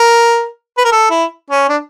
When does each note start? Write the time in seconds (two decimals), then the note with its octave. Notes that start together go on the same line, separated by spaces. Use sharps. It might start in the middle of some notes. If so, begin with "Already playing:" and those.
Already playing: A#4
0.78 B4
0.84 A#4
0.92 A4
1.11 E4
1.50 C#4
1.69 D4